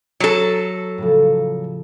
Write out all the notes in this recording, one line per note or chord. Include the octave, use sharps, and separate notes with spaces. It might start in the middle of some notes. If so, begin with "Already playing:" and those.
F#3 A4 A#5
A2 C#3 F3